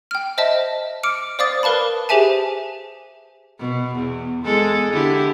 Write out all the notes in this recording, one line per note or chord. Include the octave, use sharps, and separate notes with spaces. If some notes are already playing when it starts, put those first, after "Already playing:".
G5 F6
C5 D#5 E5 A5
D6 F6 C#7 D7
C5 D5 F5 D6 D#6 A6
A#4 B4 F5 A5 B5
G4 G#4 C5 E5 G#5 A5
B2
E2
E2 G#3 A4
D3 E4 G4